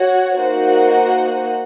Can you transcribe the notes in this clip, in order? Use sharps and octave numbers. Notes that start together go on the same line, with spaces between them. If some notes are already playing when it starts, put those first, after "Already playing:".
Already playing: F#4 C#5 F#5
A#3 D#4 F#4 C5 F#5